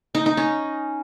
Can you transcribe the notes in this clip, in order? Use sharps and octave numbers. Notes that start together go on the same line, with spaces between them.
D#4
D#4
C#4